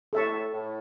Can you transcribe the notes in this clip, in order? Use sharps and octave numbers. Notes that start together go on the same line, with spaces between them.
A2 A4 E5 A5 C#6
A2